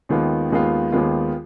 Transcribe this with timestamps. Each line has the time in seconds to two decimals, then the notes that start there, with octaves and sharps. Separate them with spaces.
0.09 D#2 D#3 G#3 B3 F4
0.50 D#2 D#3 G#3 B3 F4
0.92 D#2 D#3 G#3 B3 F4